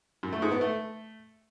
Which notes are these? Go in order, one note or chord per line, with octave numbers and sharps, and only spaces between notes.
F#2
A3
G#2
B3
A3